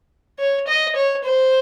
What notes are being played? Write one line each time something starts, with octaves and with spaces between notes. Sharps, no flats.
C#5
D#5
C#5
C5